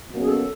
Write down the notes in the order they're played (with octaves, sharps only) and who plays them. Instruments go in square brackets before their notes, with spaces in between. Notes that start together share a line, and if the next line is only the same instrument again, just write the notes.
[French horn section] B2 F#3 A#3 C#4
[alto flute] G#4
A4